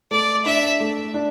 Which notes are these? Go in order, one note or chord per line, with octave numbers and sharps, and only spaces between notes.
A3 D5
D4 E5
A3
D4